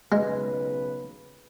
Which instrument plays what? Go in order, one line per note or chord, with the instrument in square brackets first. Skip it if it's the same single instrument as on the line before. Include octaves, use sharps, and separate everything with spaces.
[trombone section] B1 C#3 B4 [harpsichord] G#3